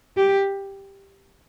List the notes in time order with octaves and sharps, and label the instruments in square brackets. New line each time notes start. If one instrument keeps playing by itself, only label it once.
[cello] G4